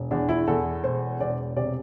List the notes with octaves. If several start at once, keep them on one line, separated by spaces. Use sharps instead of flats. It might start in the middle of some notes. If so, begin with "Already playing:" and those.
Already playing: E1
E2 D4
E4
E2 A4
E1 C5
E1 D5
C3 D5